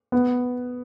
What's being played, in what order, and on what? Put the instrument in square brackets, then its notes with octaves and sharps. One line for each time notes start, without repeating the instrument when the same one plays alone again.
[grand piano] B3